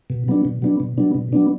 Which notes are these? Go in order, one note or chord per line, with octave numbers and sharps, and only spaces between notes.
B2
F#3 B3 D4
B2
F#3 B3 D4
B2
F#3 B3 D4
B2
F#3 B3 D4